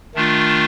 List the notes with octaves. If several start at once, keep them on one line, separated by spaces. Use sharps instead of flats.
D#3 A3 D4 F4